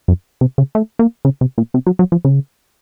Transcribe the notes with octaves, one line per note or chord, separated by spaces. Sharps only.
F#2
C3
C#3
A3
A#3
C#3
C3
A#2
C3
F#3
F#3
F3
C#3